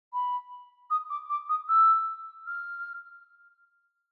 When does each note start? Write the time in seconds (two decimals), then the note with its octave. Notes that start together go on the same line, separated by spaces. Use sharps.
0.13 B5
0.90 D#6
1.10 D6
1.30 D6
1.49 D#6
1.68 E6
2.46 F6